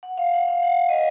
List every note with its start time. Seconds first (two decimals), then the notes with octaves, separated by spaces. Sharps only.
0.03 F#5
0.18 F5
0.33 F#5
0.48 F5
0.63 F#5
0.89 D#5
0.93 F5